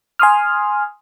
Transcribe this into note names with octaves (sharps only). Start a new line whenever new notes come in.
G#5 C6 D#6 F6